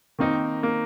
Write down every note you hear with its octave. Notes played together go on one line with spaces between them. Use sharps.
D#3 A#3 C4 D#4
A#3